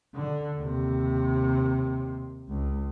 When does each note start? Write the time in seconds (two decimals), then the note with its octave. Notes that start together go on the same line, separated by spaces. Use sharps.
0.14 D3
0.56 D#2 C3
2.48 C#2